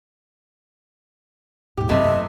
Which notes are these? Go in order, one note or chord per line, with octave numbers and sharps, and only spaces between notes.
D#1 G#2 G4
F#2 C3 E3 A3 A#3 D#5